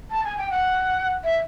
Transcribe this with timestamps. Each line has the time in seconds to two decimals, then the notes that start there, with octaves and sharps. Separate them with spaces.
0.11 A5
0.24 G#5
0.37 G5
0.50 F#5
1.24 E5